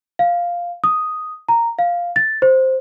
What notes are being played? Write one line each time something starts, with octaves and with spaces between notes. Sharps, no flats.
F5
D#6
A#5
F5
A6
C5